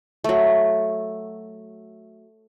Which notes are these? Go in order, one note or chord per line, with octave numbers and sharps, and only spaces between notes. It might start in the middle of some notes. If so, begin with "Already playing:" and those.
F#3 A3